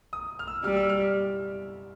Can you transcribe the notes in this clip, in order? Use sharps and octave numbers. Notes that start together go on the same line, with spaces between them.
D#6
F6
E6
G3 F6
E6
F6